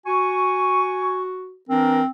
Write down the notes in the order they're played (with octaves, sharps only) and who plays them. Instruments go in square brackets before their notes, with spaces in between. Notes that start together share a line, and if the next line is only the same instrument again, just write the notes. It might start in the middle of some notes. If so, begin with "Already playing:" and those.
[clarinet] F#4 [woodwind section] G#5 C#6
[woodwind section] E3 D4 A#4 [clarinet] C4